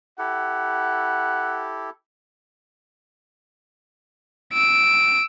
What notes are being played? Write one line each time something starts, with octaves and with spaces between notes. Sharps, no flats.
E4 G4 A4 F#5
E6 D7